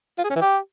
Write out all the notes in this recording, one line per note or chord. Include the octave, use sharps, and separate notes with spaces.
F4
G#4
C#4
E3
G4